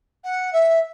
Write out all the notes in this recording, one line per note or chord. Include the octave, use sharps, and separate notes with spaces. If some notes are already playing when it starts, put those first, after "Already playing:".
F#5
E5